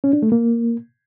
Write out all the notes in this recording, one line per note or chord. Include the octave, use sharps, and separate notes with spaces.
C#4
D4
A3
A#3